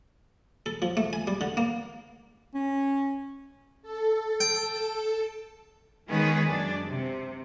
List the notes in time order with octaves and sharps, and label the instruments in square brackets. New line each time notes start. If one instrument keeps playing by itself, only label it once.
[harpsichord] A4
F3
A3
G#5
G3
D3
A#3
[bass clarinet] C#4
[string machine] A4
[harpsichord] G5
[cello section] D#3 G#3 B3 C#4 G#4 B4
F#2 D4
C3